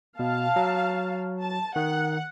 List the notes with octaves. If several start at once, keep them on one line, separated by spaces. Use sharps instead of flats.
B2 F5 A5
F#3
A5
D#3 F#5